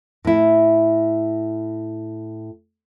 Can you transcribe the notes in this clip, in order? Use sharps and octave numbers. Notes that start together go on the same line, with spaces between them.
A2 E4